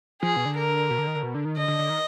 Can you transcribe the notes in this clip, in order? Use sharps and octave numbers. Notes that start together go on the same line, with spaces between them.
F3 G#4
B2
D3
A#4
B2
D3
D#3
D3
B2
D3
D#3
D3 D#5
D3
D3
D#3